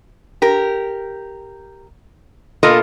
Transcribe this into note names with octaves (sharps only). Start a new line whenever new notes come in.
G4 A#4
B2 A#3 F4 A4 A#4 D#5